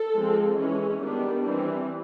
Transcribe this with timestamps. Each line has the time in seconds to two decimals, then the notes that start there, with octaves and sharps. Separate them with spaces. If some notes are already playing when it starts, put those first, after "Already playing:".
Already playing: A4
0.15 F3 G#3 C4
0.58 E3 G#3 C#4
1.02 D#3 G3 B3 D4
1.45 E3 G3 C4